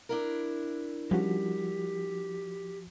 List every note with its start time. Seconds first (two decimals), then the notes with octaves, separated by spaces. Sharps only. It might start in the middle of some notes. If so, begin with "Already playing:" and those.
0.09 D4 E4 A#4
1.11 F3 G3 C#4 F#4 G4